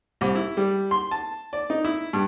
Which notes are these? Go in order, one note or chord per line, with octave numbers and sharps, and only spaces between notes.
C2
E4
G3
C6
A5
D5
D#4
E4
G2